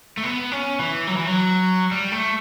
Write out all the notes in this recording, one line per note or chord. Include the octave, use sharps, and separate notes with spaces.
A3
B3
C#4
E3
F#3
E3
F#3
G3
A3